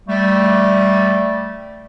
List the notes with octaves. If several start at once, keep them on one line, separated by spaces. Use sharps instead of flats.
G3 A3